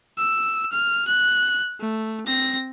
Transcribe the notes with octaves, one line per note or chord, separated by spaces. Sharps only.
E6
F6
F#6
A3
C4 A#6